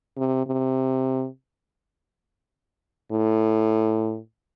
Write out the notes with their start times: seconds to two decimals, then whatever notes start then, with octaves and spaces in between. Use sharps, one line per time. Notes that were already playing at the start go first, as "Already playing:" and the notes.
0.17 C3
0.47 C3
3.12 A2